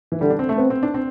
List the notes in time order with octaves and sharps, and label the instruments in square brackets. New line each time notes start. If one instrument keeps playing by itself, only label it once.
[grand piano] E3
[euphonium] D3 [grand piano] G3
[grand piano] D4
C4
A3
[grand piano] B3 [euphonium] C4
[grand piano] C4
D4
C4